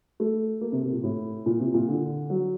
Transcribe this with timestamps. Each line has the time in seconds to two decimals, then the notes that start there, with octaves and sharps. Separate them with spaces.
0.20 A3
0.61 A#3
0.72 C3
0.83 C3
0.92 A#2
1.03 A2
1.46 A#2
1.60 C3
1.74 A#2
1.88 D3
2.30 F#3